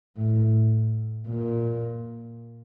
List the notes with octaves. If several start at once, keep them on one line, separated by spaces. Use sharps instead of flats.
A2
A#2